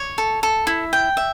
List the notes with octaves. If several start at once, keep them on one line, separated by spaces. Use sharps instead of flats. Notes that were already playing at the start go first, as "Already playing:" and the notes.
Already playing: C#5
A4
A4
E4
G5
E5